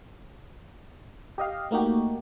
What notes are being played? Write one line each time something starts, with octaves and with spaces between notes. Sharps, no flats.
G4 D#5 F5
A3 A#3 D#4 F#4 G4